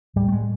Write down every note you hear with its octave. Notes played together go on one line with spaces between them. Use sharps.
A2 G3
A3
G#3